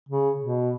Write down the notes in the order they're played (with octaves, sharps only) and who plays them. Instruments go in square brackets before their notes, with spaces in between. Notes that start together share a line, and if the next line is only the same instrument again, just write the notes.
[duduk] C#3
B2